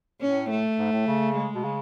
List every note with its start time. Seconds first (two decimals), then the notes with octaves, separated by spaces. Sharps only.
0.21 A2 C#4
0.50 A3
0.79 G#2
0.92 A2
1.07 C#3
1.36 G#3
1.55 B2
1.64 C#3